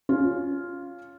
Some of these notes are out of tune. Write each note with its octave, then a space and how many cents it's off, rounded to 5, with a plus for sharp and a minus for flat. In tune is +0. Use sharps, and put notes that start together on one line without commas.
C#4 +20 F4 +0